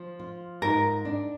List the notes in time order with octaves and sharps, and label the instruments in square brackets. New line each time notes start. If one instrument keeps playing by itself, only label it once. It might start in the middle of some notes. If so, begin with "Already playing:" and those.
Already playing: [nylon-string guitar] F3
F4
[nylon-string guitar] G#2 [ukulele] A#4
[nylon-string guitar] D4